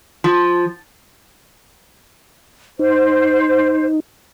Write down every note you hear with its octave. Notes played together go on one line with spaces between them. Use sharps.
F3
D#4 C5